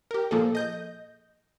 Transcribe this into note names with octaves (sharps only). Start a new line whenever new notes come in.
G4 A#4
A#2 F3 A#3 G#4 A4
D#5 G6 A#6